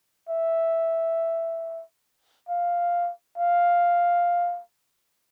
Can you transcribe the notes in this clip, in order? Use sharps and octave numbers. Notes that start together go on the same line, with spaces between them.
E5
F5
F5